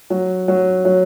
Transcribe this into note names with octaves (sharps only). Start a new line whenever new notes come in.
F#3
F#3
F#3